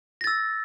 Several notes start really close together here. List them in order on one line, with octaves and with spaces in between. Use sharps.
A#6 A6 E6